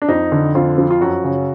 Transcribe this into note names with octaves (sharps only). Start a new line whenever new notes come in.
D4
F2 D#4
D3
F2 F4
F3
F4
F#2 F#4
C#3